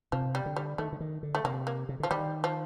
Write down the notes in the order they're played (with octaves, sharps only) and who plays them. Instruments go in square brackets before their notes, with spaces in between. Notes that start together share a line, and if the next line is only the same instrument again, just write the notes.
[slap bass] C3 [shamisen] F3
[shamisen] G3
[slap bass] D3
[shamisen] G3
[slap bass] D#3 [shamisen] A3
[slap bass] D3
D#3
D3
[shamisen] A3
[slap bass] C3 [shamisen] A#3
[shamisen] A#3
[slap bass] C3
[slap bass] D3 [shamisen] F3
[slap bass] D#3 [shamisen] G3
[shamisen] F3